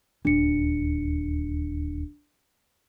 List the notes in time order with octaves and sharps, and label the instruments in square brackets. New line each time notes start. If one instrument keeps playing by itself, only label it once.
[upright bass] D#1 D2 [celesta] D4 C#7